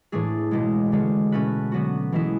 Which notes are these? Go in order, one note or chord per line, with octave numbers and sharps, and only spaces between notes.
A2 E3 A3 D4 G#4
C#2 B2 G#3
D3 G#3 C#4
B2 A3 C#4 F#4 B4
D3 F#3 B3 F#4
E3 G#3 B3 E4